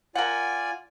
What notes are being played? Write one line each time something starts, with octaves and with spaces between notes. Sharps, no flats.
F4 A#4 D5 F#5 G#5